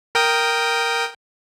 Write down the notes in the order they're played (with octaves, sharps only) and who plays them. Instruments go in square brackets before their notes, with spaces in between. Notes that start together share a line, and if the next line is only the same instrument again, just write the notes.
[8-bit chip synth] A#4 G5 D#6